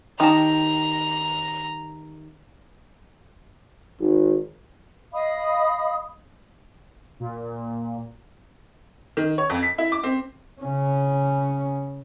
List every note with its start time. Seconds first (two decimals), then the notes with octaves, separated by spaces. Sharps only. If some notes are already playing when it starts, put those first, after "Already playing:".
0.20 D#3 G4 A5 A#5
3.99 G#1
5.13 D#5 F5 B5 D#6
7.20 A#2
9.17 D#3
9.38 C#5
9.50 F2
9.63 B6
9.78 E4
9.92 D6
10.03 C4
10.61 C#3 C#4